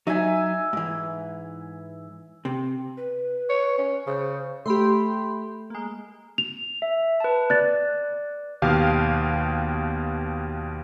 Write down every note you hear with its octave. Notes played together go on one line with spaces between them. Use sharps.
F#3 D#4 E5 G#5
G#2 E3
C3
B4
C#5
C#4
C#3 C5
A3 G4 B5 C6
G#3 A#3
F7
E5
B4 A5
D5 F#6 A6
D#2 B2 G4 F5